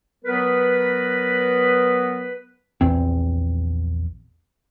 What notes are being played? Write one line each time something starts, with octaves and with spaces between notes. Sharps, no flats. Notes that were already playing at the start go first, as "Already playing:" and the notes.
F#3 B3 A#4 B4
A#1 E2 C4